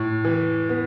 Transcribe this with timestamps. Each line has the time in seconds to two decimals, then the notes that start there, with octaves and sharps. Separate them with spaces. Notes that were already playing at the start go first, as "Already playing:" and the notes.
Already playing: A2
0.25 E3
0.69 B3